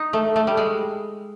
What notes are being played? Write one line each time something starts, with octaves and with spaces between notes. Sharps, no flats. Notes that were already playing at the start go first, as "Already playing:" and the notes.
Already playing: D#4
A3
A3
G3
G#3